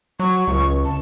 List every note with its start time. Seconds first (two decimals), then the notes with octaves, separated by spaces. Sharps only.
0.20 F#3 C#6
0.48 C#2
0.84 A5